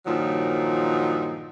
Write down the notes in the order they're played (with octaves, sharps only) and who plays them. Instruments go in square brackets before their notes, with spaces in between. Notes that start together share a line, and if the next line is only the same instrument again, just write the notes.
[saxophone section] G2 A#2 D#3 F3 F#3